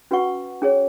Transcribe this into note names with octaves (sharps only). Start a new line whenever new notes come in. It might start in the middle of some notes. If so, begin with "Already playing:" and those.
C#4 F#4 B4 F#5 C#6
C#4 G#4 C#5